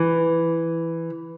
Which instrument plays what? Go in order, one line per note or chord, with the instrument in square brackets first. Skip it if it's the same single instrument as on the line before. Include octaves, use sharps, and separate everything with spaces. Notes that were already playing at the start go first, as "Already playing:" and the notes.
Already playing: [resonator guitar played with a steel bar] E3